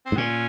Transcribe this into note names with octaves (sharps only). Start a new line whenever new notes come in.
C4
G#2
A#2 C#4